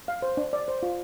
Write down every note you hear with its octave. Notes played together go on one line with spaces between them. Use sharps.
F5
C5
D4
D5
C5
F4